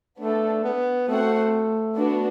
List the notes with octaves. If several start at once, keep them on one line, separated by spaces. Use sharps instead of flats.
A3 B3 D4 A4
B3
A3 C4 F#4 C5 F#5
B3 D4 F#4